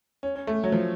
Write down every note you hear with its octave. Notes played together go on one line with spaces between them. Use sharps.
C#4
C#4
A3
F#3
F3